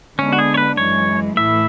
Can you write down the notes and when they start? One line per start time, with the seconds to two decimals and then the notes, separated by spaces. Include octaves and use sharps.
0.18 D3 G#3 B3 C#4 D4
0.33 F#4
0.38 G#4
0.54 C#5
0.57 B4
0.77 F#2 E3 G#3 C#5
1.37 A2 E3 A3 E4 E5